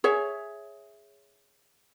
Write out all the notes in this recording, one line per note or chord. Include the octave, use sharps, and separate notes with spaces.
G#4 C#5 E5